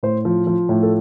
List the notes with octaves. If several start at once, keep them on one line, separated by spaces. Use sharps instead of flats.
A2 C5
F3
F3
A2
A4